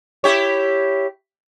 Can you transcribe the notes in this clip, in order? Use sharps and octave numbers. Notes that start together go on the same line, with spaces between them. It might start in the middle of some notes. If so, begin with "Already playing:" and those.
E4 G4 C#5